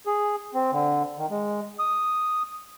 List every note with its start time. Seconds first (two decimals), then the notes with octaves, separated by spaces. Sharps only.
0.07 G#4
0.54 C4
0.73 D3
1.18 D#3
1.31 G#3
1.79 D#6